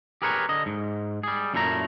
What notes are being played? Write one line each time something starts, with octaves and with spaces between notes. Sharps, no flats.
G4 G#4 A#4 B4 C#5
D3 D#5
G#2
G3 G#4
F#2 A#2 A3 E4 A#5